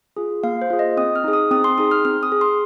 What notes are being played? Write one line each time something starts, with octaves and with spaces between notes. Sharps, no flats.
F4 G#4
A#3 F5
C5
F4 G#4
D#5
C4 D#6
F6
D#4 G#4
D#6
C4 D#6
C6
D#4 G#4 D#6
F6
C4 F6
D#6
G#4
C6